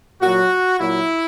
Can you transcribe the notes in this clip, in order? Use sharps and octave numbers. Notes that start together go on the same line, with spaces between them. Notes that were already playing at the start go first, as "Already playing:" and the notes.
A#2 F#3 F#4
A#2 F#3 E4